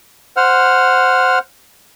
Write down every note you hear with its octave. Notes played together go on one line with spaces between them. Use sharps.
C5 F#5 F6